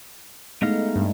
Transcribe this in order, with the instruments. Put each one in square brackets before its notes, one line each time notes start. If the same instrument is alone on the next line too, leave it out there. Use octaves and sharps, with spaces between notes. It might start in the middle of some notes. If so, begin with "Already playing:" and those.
[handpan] G#3 A3 D#4 [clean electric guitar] B3 D#5 F5
[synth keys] G2